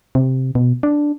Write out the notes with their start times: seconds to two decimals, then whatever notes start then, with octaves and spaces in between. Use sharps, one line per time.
0.15 C3
0.55 B2
0.83 D4